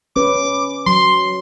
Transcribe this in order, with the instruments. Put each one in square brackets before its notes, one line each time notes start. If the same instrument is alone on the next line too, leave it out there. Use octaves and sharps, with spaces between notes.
[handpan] C#4 B4 [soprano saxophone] D6
[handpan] F#3 [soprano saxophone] C6